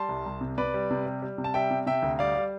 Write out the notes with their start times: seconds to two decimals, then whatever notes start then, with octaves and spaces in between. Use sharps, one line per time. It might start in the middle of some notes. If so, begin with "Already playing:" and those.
Already playing: G3 A5 C6
0.09 C2
0.26 C2
0.41 C3
0.58 C3 B4 D5
0.74 G3
0.91 C3
1.06 G3
1.22 G3
1.38 C3
1.44 A5
1.54 G3 E5 G5
1.71 C3
1.86 C3 E5 G5
2.03 D2
2.19 G3 D5 F5
2.36 G3